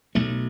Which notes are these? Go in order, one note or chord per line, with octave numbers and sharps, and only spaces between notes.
B1 B2 F#3 A3